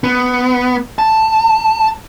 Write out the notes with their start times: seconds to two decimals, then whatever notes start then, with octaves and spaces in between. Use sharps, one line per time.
0.04 B3
0.99 A5